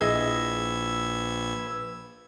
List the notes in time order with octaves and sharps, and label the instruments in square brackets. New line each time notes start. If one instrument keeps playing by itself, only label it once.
[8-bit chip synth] A#1 G#6 [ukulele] E4 G#4 D#5 [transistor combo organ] B4 E6